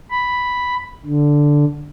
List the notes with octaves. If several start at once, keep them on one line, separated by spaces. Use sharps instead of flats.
B5
D3